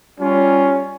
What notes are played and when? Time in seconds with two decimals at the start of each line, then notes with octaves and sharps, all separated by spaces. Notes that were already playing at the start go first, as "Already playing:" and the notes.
0.20 G3 C#4 F4